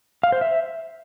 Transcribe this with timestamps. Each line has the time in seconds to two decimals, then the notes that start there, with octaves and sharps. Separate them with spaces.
0.23 F5
0.32 C5
0.41 E5